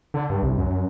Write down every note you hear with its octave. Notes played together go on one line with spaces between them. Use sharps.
D3
G2
C2
F#2
F#2